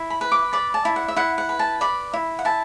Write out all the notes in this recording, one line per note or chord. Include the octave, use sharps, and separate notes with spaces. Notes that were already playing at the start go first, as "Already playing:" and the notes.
Already playing: E4
B5
B4
D6
D5 B5
A5
E4
F#5
E5
E4 F#5
F#5
B4
A5
D5 B5
E4
F#5
E4 A5